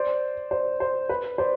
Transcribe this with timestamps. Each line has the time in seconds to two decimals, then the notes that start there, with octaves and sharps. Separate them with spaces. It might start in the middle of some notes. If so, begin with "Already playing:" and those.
Already playing: C5 D5
0.51 C5 D5
0.80 C5
1.09 B4
1.38 C5 D5